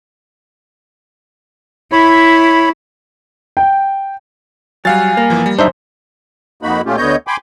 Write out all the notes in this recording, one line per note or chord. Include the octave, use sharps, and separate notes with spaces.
E4 C#5 B5
G5
F#3 G3 F5 G#5 A6
A#3
G1 E3 F3
G3
F#2 D4 D#4 C5 E5
F2 A#3 D#4 F#4 B5
A#2 A3 C#4 F4 G4
D2 D3 B3 C#5 D#5 G6
G5 G#5 B5 C6 D6